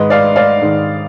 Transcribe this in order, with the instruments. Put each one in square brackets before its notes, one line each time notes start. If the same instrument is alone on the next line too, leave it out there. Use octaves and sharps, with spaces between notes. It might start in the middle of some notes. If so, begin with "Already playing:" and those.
Already playing: [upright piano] G#2 D#3 G#3 B4 D#5
D5 F5
D5 F5
G#2 D#3 G#3